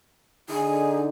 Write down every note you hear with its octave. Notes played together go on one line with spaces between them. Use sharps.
D3 D#4 G#4